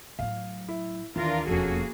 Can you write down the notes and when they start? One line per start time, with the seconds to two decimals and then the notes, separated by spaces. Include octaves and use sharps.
0.19 A2 F#3 F5
0.69 E4
1.16 D#2 E3 D4 F4 A#4
1.48 E1 F2 A#3 C#4 F#4 G#4 A4